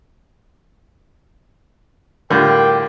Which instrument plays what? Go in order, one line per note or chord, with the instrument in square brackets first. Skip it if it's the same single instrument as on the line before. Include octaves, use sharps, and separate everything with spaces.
[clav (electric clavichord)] A2 [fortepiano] D3 G3 F4 [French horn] A#4 [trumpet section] G5 D6